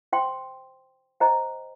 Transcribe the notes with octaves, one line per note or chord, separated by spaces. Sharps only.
C5 G5 C6
C5 D#5 G5 A#5